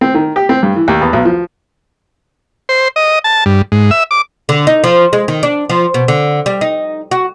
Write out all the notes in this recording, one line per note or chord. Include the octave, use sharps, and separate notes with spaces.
C4
D#3
G4
C4
G2
E3
D#2
E2
B1
F3
C5
D#5
A5
G2
G#2
E5
D6
D3
D#4
F3
G#3
D#3
D4
F3
B2
D3
G3
D#4
F#4